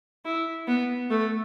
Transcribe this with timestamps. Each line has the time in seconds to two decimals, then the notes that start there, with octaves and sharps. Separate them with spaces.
0.25 E4
0.67 B3
1.10 A3